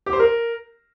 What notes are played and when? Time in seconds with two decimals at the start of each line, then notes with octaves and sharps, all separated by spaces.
0.06 G4
0.13 C5
0.20 A#4